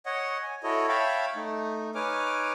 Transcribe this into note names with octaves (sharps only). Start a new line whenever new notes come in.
C#5 D#5 F#5
G#5
E4 F#4 A4 C#5 D#5
C#5 E5 F5 G5 A5 B5
A3 D#4
D#4 B4 C#5 G#5 D6 F6